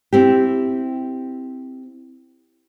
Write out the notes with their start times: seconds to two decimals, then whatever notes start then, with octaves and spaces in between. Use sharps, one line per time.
0.13 C4 E4 G4